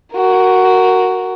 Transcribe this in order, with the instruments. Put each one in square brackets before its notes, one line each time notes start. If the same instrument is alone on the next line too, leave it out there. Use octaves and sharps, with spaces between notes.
[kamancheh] F#4 A#4